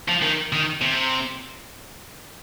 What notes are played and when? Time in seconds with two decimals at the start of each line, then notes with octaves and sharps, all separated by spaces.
0.08 F3
0.22 D#3
0.53 D#3
0.81 C3